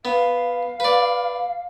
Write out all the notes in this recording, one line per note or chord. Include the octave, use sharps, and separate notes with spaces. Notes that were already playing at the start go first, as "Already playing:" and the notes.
B3 F5
B4 D5